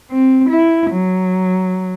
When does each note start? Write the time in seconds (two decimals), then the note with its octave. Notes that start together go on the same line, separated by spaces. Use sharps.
0.11 C4
0.50 E4
0.91 F#3